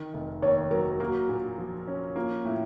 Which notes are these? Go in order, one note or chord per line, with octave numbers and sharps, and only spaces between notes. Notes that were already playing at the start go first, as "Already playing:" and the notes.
Already playing: D#3
F1
D#2 C#5
F#3 A#4
A#3 F#4
A#2
F3
C#4
A#3 F4
A2